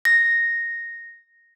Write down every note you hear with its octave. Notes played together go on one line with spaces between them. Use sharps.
A#6